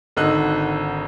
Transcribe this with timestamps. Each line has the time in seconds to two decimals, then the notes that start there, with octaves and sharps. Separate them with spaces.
0.17 G#1 D3 D#3 D#5 E6 F#6